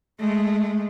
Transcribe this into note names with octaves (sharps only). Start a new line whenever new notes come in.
G#3 A3